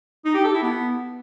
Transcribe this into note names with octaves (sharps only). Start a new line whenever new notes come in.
D#4
G4
A4
E4
B3